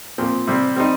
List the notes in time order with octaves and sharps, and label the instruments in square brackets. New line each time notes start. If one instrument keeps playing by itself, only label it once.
[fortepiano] A#2 F3 C4
C3 G3 C4
G3 C4 D#4